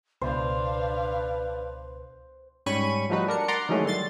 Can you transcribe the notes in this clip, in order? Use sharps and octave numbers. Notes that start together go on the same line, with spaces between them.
C#2 B2 D4 B4 C5 F5
G#2 G3 C#4 B5 C#6 D#7
F3 G3 A3 D#4 F#4 B4
D4 A#4 C#7
D5 F#5 A#5 C6 D6
D#3 E3 F#3 G#3 A3 C#4
G2 D3 C6 A6